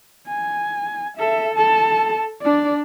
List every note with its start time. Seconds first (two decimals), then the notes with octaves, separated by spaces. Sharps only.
0.28 G#5
1.17 A4 E5
1.55 A4 A5
2.42 D4 D5